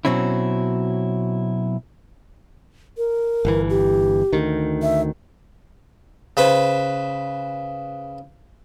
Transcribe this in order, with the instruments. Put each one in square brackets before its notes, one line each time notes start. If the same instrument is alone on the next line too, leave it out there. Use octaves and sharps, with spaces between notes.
[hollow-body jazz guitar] B2 F#3 C4 C#4 E4
[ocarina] A#4
[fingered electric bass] G1 E3
[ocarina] G4
[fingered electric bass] D2 D#3
[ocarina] E5
[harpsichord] C#3 B4 C5 B5